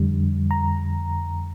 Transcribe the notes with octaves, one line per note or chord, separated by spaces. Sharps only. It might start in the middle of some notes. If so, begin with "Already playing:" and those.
Already playing: F2 D3 G3
A#5